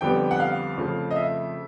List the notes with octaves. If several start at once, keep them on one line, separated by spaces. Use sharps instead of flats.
F2 D3 G3 B3 G5
F#5
F5
F2 C#3 F3 A3
D#5
E5